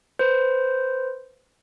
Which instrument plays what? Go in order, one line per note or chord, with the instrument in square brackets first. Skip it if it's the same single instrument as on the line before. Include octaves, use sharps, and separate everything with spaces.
[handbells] B4 C5